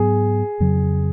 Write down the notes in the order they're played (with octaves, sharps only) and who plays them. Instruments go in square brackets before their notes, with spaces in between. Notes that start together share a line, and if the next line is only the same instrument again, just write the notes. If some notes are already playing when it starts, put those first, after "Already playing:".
Already playing: [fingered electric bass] G#2 F#3 B3 [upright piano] G#4
[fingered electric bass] F2 C#3 F#3